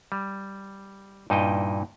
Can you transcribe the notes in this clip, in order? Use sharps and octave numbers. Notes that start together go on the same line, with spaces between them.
G3
G2 A#2 D#4 E4 D#5 G5